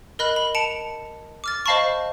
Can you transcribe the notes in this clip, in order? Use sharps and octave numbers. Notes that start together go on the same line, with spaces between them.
A#4 D#5 B5 F#6
B5
A5 C#7 D7 F7
D6 F6 A6
C5 D#5 F5 A5 B5 C#6